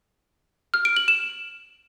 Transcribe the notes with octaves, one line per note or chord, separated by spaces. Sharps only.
F6
D7
F#7
E7